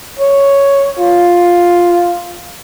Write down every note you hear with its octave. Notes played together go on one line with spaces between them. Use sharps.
C#5
F4